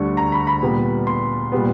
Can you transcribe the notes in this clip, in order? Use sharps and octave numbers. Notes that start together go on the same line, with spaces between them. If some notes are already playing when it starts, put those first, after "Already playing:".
Already playing: D2 D3 G3 C#6
A#5
B5
B5
A#2 G3 B3
C6
A#2 G3 B3